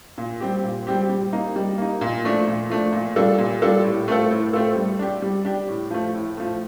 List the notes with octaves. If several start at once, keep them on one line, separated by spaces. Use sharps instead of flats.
A#2
G3 C4 G4
A#2
G3 C4 G4
G3
A#3 D#4
G3
A#3 D#4
A#2
F3 A3 D4
A#2
F3 A3 D4
A#2
G3 D4 F4 A4
A#2
G3 D4 F4 A4
A2
A3 C4 F4 A4
A2
A3 C4 F4 A4
G3
D4 G4
G3
D4 G4
A2
F3 A3
A2
F3 A3